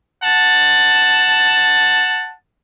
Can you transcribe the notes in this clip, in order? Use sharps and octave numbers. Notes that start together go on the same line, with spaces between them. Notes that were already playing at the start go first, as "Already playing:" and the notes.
F#5 A5